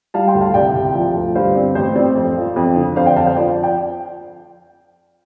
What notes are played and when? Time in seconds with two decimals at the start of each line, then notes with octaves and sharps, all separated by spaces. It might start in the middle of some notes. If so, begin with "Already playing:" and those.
0.14 G3 F5 A5
0.28 G5 C6
0.35 D2
0.41 F5 A5
0.54 C2 D5 G5
0.75 C2
0.95 F3
1.15 D2
1.35 G2 C5 F5
1.55 C4 D5
1.75 A1 C5
1.95 C4 D5
2.16 F2
2.36 F3
2.56 F2
2.76 D3
2.96 F2 C5 F5
3.06 D5 G5
3.16 F2 F5 A5
3.27 C5 F5
3.36 F3 D5
3.63 D5 G5